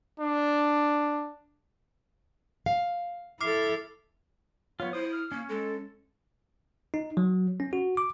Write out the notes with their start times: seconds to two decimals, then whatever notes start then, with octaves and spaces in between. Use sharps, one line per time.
0.20 D4
2.66 F5
3.41 E4 A4 D6 F6 C7
4.80 F#3 B3 F4 C#5
4.93 E4 C5 D#6
5.12 F6
5.32 A#3 C#4
5.49 G#3 A4
6.94 D#4
7.17 F#3
7.60 C#4
7.73 F#4
7.97 D6